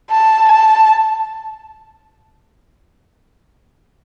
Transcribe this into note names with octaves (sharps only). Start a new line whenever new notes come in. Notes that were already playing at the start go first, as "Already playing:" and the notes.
A5
A5